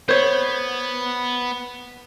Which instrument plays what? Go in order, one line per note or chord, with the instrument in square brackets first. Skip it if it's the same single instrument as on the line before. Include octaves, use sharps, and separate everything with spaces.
[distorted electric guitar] B3 [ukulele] C5 C#5